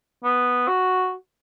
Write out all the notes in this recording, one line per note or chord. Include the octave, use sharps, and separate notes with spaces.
B3
F#4